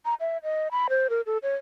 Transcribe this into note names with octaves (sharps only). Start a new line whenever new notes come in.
A#5
E5
D#5
B5
C5
A#4
A4
C#5